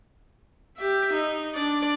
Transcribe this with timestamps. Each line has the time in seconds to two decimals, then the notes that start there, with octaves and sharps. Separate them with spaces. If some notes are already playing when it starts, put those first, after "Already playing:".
0.78 G4 E5
1.14 D#4
1.54 D4 D5